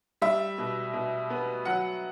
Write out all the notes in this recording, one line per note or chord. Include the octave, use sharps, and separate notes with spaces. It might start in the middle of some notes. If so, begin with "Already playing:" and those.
G3 E5
B2
B2
B3
F#3 F#5